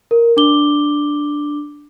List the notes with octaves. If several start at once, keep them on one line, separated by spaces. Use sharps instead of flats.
A#4
D4 D6 G7